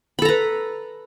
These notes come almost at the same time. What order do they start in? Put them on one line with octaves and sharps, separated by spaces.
B5 A4 A#5 B4